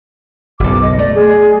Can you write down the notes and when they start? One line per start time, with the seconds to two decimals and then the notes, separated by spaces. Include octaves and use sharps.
0.60 F#1 B1 D6
0.82 D#5
0.98 A3 D5
1.15 G#4